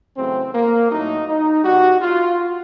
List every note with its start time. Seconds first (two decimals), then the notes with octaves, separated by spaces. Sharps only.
0.16 E2 C#3 F#3 A3 C4
0.54 A#3
0.90 A2 F#3 A3 D#4
1.27 D#4
1.64 B2 G3 F#4
2.01 F4